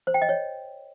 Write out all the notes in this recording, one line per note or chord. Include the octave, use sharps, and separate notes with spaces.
C5
G5
D#5
C#5